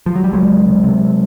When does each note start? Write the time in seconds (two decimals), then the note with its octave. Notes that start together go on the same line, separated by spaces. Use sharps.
0.06 F3
0.16 F#3
0.24 G3
0.33 C#2 F#3 G#3
0.50 C#2
0.67 C3
0.84 C3